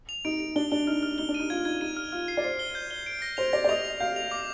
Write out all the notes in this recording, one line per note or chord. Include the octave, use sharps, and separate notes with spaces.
F7
D#4 D7
D7
D4 G7
D4 G7
D#4 F6
F6
D#4 G7
D4
D#7
D#4
F4 G#6
D#4 G#6
D#4 D#7
F6
F4 F6
C7
D5
C5 C7
G7
G6
G7
D7
A#6
C5 F7
D5 A#6
D5
D#5 F7
F7
F5 G6
F7
D6